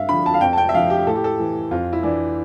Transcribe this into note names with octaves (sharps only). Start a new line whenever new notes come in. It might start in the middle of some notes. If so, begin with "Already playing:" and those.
Already playing: G2 E5 F5
D3 F3 B5
A5
F5
F2 G5
A5
G5
E5
D3 F3 F5
G4
A2 A4
G4
A4
E3
F2 F4
E4
E3 D4